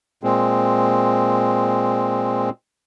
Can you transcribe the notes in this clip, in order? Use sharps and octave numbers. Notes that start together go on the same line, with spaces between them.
A#2 G#3 C4